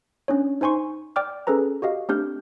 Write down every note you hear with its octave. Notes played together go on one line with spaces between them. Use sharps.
C#4 D4 C#5
D#4 C5 G#5 C6 C#6
D5 G5 D6 F6
C#4 G#4 A4 B4 A#5
F#4 G4 D#5 F5
A3 C4 D4 G4 F6 G6